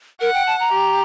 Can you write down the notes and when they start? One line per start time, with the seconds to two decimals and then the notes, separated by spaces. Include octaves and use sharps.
0.21 A#4 F#5
0.34 G5
0.47 A5
0.60 A#5
0.72 G4